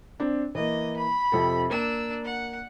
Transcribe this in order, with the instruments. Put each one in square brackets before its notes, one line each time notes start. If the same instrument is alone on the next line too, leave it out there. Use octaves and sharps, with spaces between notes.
[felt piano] C4 D4
[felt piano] E3 A#3 [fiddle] D#5
[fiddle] B5
[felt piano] F2 C3 A4
[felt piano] A#3 [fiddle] D4 E6
[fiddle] F#5